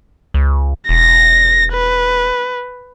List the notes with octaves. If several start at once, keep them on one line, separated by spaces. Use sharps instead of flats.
C#2
E1 A#6
B4